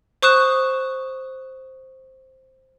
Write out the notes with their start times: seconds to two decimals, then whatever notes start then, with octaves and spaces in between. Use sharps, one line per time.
0.23 C5 C#6 D#6 F#6 E7